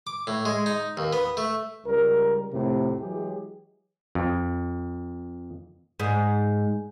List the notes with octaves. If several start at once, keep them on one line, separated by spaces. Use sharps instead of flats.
D6
A2
G#3
D#4
D#2
B3
A3
C#2 G3 A#4
F2 A2 C3
E3 F#3 G#3 G4 G#4
F2
G#2